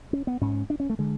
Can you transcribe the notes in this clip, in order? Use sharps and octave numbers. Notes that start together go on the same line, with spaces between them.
C#4
B3
G#2 C#4
D4
C#4
A3
D3 G#3